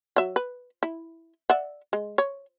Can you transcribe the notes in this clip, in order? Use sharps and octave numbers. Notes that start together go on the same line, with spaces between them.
F#3 E5
B4
E4
D5 E5 F#5
G#3
C#5